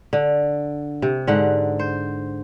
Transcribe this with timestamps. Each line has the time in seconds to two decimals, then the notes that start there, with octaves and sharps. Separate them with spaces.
0.13 D3
1.02 C3
1.27 G#2 D3 F#5
1.79 C5